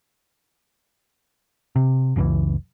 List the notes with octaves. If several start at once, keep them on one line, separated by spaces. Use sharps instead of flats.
C3
F#1 C#2 A#2 E3